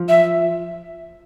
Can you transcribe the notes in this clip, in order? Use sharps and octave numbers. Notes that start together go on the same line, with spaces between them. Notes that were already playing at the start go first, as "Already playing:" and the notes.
Already playing: F3
E5